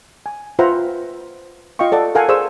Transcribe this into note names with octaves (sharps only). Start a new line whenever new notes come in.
G#5
F4 B4 C5 E5 F#5 A#5
F4 D#5 F5 G5 C#6
A4 D5 F#5
A4 A#4 F5 F#5 G#5
G#4 C5 D5 C#6 E6